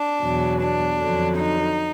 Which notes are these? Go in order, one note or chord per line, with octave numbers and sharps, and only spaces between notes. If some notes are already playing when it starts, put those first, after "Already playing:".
Already playing: D4
E2 B2 F#3
D4
F2 D3 F#3
D#4